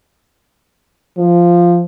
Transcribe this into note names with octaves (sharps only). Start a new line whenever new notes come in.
F3